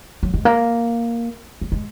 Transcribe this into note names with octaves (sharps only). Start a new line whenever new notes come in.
F#3
G#3
A#3
F#3
G#3